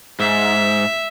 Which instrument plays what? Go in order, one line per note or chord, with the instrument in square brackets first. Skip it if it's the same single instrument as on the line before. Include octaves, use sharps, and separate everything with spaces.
[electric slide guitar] G#2 [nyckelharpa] E5